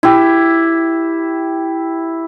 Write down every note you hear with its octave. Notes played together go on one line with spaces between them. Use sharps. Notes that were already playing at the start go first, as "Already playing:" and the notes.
E4 G4